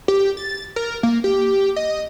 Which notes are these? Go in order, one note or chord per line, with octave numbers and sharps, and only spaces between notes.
G4
A6
A#4
A#3
G4
D#5